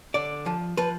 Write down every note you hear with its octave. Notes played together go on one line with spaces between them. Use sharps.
D3 D5
F3
F3 B4